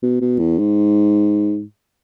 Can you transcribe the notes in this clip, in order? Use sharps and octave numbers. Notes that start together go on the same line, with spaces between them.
B2
B2
E2
G#2